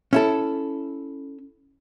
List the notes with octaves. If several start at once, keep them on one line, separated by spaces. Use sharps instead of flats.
C#4 E4 A4